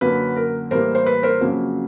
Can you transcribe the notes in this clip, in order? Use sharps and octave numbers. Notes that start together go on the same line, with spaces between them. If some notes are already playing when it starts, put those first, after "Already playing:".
F#2 D3 F#3 A#3 B4
A#4
A2 E3 G3 A#3 A#4 C5
C5
B4
A#4 C5
F2 C#3 F#3 A#3